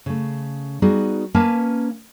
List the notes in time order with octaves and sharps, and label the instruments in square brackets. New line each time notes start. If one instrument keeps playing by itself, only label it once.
[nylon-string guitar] C#3 A3
G3 B3 D#4 F#4 G#4
A#3 C#4 A#4 B4 F5 A5